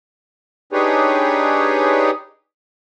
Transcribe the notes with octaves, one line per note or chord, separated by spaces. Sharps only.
D4 D#4 G4 G#4 B4 C#5